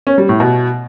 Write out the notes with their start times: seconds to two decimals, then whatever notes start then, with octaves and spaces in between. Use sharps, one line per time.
0.07 C#4
0.18 G3
0.29 A2
0.40 B2